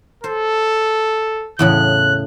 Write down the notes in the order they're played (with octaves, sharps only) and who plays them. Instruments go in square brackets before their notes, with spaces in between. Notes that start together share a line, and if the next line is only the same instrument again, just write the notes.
[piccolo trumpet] A4 [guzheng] C5
[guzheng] E2 A2 C#3 [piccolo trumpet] F#6